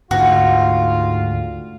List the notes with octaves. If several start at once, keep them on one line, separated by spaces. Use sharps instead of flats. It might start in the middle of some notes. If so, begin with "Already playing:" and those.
D2 G#2 F4 F#4